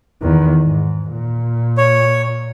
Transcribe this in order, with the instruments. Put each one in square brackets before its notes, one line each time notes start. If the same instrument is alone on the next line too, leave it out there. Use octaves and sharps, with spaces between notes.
[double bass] E2 D#3
G#2
A#2
[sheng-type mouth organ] C#5